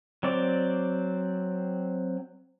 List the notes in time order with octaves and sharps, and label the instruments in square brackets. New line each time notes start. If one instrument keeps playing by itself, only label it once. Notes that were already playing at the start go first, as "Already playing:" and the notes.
[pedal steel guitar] F#3 C4 D5